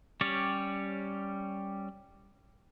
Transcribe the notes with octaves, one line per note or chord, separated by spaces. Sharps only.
G3 C#4 G4 C#5 D5